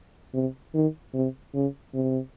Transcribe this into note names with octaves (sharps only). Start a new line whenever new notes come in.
C3
D#3
C3
C#3
C3